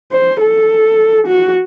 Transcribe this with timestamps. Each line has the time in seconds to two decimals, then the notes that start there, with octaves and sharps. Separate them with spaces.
0.12 C5
0.41 A4
1.27 F#4